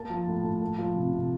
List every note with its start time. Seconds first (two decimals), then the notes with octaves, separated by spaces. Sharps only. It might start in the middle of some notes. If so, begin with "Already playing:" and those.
Already playing: A#3 A5
0.10 F3
0.27 A2
0.44 A2
0.61 A#3
0.78 F3
0.96 C3
1.12 C3